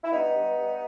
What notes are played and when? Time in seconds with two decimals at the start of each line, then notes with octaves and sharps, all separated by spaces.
0.04 E4
0.13 G2 B3 D#4
0.35 G2
0.56 G2